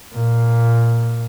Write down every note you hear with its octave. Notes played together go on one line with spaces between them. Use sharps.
A#2